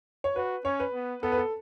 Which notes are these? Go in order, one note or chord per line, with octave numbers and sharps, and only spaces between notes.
C#5
F#4 B4
C#4 C#5
B4
B3
B3 A4
B4
A4